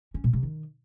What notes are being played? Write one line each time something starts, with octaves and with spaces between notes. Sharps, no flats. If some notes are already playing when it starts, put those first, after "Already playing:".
C#4
B2
C3
D#3